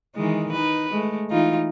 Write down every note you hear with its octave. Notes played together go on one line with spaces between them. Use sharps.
D#3 E3 G#3
D#4 B4
G#3 A3
E3 D#4 F4